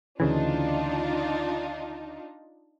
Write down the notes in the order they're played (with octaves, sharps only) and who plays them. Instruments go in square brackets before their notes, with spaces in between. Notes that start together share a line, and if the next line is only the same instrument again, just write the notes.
[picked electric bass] D2 C#3 E3 [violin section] D4 D#4 F4